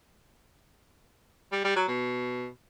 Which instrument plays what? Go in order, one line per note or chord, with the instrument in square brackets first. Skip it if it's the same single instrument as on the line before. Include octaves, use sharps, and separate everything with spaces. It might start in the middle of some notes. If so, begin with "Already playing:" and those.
[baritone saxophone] G3
G3
F#3
B2